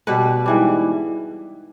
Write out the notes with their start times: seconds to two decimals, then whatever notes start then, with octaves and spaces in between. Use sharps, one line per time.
0.07 B2 G3 B4
0.46 G#2 E3 G3